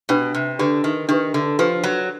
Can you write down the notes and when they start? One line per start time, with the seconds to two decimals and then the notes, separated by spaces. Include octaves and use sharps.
0.09 B2 D4 G4 B4
0.34 C3
0.59 D3 D4 G4 B4
0.84 D#3
1.09 D#3 D4 G4 B4
1.34 D3
1.59 F3 D4 G4 B4
1.84 F#3